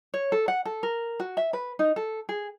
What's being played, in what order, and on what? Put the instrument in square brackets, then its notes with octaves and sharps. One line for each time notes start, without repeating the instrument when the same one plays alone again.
[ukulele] C#5
A4
F#5
A4
A#4
F#4
E5
B4
D#4
A4
G#4